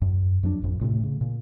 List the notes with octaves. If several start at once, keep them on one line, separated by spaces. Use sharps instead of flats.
F#2
F2 F#3 B3 D4
A1 F2
A2 C3 A3
C#3
A#2